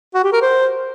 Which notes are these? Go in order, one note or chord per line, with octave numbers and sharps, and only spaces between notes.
F#4
G4
A#4
C5